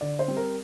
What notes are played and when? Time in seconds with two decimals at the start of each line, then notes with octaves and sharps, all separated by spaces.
0.01 D3 D5
0.19 C5
0.28 G3 C4
0.37 A#4